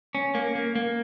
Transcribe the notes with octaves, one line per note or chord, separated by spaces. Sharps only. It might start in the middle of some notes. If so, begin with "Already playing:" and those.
C#4
A#3
A#3
A#3